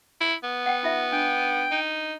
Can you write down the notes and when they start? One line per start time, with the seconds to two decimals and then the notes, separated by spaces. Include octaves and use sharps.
0.21 E4
0.43 B3
0.66 F#5 G5
0.83 D#4 F4 E5
1.12 D4 G5
1.71 D#4